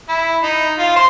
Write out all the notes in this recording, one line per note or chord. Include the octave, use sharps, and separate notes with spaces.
E4
D#4
F4
C5